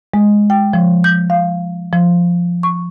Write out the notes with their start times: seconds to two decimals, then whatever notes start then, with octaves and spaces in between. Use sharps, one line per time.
0.14 G#3
0.50 G5
0.73 F3
1.04 G6
1.30 F5
1.93 F3
2.63 C#6